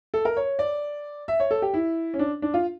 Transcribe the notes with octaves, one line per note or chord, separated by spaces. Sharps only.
A4
A#4
C#5
D5
E5
C#5
A4
G4
E4
C#4
D4
D4
F4